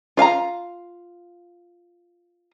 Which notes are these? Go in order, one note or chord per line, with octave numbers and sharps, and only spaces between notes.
F4 F5 G#5 A#5